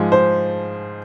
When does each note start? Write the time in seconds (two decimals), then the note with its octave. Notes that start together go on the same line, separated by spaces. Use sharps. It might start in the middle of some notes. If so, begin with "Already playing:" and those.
Already playing: G#2 F3 G#3
0.12 C5